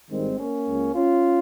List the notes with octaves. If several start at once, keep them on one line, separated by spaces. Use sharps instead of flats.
G#1 G2 D#3 G#3 C4
A#3 C#4
C#2 C#3
C#4 F4